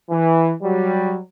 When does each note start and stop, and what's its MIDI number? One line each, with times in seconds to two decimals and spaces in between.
0.10 0.52 52
0.63 1.18 54
0.63 1.18 55